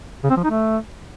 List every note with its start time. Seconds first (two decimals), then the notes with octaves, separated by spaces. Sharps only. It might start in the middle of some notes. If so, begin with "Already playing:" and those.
0.24 C#3
0.30 C4
0.37 F3
0.44 D#4
0.50 A3